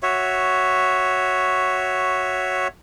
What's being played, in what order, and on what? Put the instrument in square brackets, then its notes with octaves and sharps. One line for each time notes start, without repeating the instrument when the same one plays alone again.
[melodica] F#4 C#5 E5